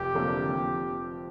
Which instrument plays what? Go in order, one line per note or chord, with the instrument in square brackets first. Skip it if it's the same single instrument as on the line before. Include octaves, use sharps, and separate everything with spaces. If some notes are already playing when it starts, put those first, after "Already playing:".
Already playing: [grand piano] F1 [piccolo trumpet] G4
[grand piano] F2 D3 A#3
F2